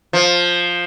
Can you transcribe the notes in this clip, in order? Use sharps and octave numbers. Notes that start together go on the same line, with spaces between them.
F3